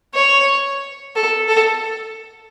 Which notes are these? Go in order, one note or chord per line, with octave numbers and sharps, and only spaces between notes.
C#5
A4
A4